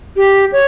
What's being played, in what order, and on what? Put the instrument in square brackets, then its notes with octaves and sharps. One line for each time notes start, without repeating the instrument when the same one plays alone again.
[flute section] G4
C#5